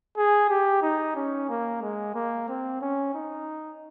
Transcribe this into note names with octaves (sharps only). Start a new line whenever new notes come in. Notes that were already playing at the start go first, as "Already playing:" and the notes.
G#4
G4
D#4
C#4
A#3
G#3
A#3
C4
C#4
D#4